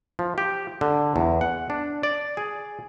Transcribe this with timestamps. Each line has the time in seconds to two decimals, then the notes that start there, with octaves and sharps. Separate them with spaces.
0.19 F3
0.38 G4
0.81 D3
1.16 E2
1.41 F#5
1.70 D4
2.03 D5
2.37 G#4